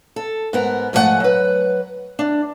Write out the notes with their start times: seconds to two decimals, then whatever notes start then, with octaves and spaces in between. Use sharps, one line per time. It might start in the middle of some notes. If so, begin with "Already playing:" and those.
0.16 A4
0.53 G#2 B3 A#4
0.93 G#2 F3 A3 F#4 F#5 G#5
1.20 F#3 B4
2.19 D4